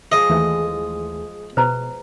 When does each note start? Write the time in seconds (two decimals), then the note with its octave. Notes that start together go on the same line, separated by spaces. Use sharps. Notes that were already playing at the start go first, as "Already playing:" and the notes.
0.12 F3 G#3 D#5
0.29 D#2 E3 A3
1.57 B2 B4 C5 A#5